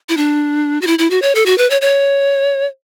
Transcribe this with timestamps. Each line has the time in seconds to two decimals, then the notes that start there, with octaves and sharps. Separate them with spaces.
0.09 E4
0.17 D4
0.81 F#4
0.87 E4
0.99 E4
1.10 F#4
1.22 C#5
1.35 A4
1.46 F#4
1.58 B4
1.70 C#5
1.81 C#5